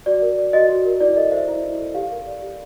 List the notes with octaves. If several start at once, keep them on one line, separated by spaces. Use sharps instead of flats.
F#4 D5
A#4
D5
F#4 D#5
F#4
A#4
E4 D5
A4 D#5
C5 E5
E4 E5
E4
A4
G4 F5
A#4
D5
G4